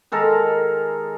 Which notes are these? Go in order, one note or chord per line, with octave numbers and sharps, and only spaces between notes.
D#3 G#3 A4 A#4